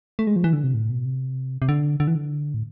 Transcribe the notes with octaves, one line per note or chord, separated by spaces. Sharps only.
A3
G#3
F3
E3
D3
C3
A2
B2
C3
C3
D3
D3
E3
D3
A2